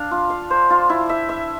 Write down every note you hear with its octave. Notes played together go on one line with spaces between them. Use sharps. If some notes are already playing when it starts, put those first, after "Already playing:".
Already playing: D4 F5
F4
F5
C5
F4
E4
E5
E5